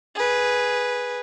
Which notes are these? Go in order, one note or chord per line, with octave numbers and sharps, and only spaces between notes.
G#4 B4